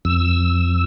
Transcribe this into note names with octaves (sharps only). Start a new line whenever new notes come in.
F2 E6